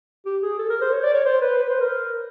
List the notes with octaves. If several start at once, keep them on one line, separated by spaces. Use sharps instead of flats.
G4
G#4
A4
A#4
C5
C#5
D5
C#5
C5
B4
B4
C5
A#4